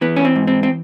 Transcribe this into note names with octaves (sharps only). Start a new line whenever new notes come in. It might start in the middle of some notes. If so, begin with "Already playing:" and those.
E3 B3
C#4
C4
G#2
C4
C4